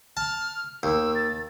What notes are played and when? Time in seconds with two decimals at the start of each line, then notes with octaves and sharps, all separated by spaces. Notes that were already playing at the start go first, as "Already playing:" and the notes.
0.17 A5 F6
0.83 D#2 E6
1.15 A6